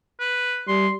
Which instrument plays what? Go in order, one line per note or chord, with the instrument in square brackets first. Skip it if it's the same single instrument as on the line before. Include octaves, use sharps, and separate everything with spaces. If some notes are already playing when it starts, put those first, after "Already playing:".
[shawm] B4
[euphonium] G3 [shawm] C6